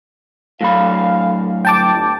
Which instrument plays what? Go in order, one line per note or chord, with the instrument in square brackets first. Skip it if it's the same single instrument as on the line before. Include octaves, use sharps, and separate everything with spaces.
[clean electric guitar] A2 F#3 B5 [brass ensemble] F5
[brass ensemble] G1 [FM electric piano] G5 A5 D6